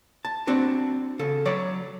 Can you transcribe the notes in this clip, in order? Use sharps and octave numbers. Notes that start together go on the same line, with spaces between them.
A5
C4 D4 F#4
C#3 A4
F#3 C#5 D5